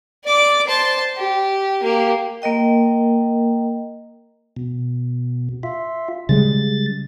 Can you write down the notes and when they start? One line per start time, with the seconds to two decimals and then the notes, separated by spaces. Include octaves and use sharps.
0.24 D5 D6
0.67 C5 A5
1.17 G4
1.83 A#3 G4
2.42 A#3 A#4 D#5 G5
4.56 B2
5.63 F4 E5
6.29 C#3 G3 G#3 A6